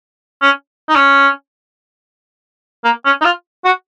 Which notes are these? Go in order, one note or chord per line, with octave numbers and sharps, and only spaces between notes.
C#4
D#4
C#4
A#3
C#4
D#4
F4
F#4